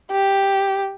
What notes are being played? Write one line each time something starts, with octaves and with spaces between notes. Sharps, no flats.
G4